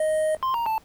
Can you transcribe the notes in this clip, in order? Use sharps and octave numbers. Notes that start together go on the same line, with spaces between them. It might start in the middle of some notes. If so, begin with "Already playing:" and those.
Already playing: D#5
C6
A#5
A5